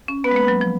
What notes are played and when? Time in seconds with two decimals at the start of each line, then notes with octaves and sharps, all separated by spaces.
0.08 C#4
0.24 B3 B4
0.31 G#3
0.36 A#3
0.48 F#3
0.61 F3